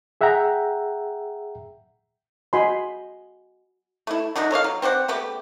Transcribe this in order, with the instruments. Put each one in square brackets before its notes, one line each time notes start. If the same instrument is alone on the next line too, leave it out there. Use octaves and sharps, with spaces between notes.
[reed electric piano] G#4 E5 F#5 G5 A#5
[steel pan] F#4 D#5 G#5 B5 C6
[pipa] A3 E4
F#3 D4 D#4 F#4
A4 C#5 D#5 F5
F#3
C4 C5 D5 F#5
C#3 A3 B3 G4